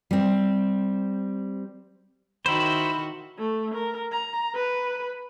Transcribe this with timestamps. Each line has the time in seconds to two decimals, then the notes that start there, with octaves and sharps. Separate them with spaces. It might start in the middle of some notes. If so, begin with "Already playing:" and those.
0.11 G3 C4
2.46 D#3 E4 F#4 C5 B5
3.39 A3
3.75 A#4
4.12 A#5
4.55 B4